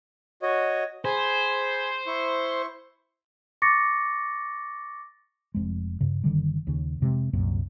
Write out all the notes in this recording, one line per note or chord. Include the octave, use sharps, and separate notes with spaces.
F#4 C#5 D#5
G#4 C5 G#5 B5
E4 C6 C#6
C#6 D6 A6 A#6 C#7
F1 F2 G#3
G2 C#3
F#1 D3 D#3 G3
D#2 C#3
F2 C3 G#3
F#1 C2 F#2 A#2